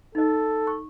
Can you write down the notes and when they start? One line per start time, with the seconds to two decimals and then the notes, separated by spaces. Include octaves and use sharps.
0.15 D#4 A4 D#5
0.67 C#6